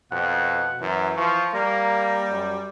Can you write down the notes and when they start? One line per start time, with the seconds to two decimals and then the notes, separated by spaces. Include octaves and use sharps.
0.12 F2 B2 F#5
0.81 F#2 E3
1.17 F3 C#6
1.54 G3 A#3 A#5
2.30 F#2